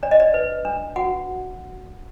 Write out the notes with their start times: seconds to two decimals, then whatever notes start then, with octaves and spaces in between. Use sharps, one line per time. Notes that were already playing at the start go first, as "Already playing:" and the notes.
0.03 D4 D5
0.11 D#5
0.20 D5
0.34 B4
0.65 D4
0.96 F#4 F#5